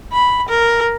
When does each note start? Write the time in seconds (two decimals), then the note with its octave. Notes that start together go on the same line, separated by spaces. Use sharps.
0.13 B5
0.49 A#4